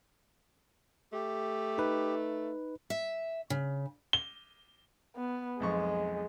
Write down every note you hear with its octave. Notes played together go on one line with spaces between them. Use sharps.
A3 G4
D#4 B4
E5
C#3
G7
B3
B1 F2 G#3 C#6